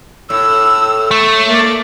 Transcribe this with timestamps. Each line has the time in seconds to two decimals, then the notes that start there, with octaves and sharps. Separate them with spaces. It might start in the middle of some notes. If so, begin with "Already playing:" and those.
0.30 A2 E6
1.11 A3
1.48 A#3 D5